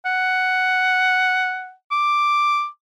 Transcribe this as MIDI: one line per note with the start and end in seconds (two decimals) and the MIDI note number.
0.05 1.73 78
1.91 2.67 86